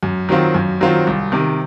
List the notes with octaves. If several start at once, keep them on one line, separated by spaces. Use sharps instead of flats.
F#2
D#3 F#3 C4 F4
F#2
D#3 F#3 C4 F4
C2
C3 D#3